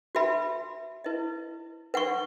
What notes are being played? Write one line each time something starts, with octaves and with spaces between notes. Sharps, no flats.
F#4 B4 E5 B5
E4 B4 D#5
B4 F#5 C#6